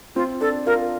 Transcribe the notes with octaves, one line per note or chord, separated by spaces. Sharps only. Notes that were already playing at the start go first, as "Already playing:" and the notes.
C4 F4
D4 A4
F4 A#4